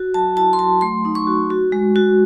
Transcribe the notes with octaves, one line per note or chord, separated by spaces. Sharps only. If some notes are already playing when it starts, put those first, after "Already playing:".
Already playing: F#4
F#3 A5
E4 A5
C6
F#3 A5
A3 C6
D#4
C#6
F#4
F#4
G#3
F#4